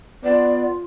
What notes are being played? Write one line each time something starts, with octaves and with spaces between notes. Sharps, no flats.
B3 F4 D5